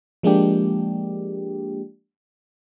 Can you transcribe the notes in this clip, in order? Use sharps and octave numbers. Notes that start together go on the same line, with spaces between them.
F3 G#3 A#3 D4 G4